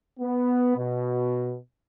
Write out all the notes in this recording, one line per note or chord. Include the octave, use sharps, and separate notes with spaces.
B3
B2